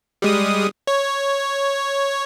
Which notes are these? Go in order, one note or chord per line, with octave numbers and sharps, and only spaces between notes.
G3 G#3 D#6
C#5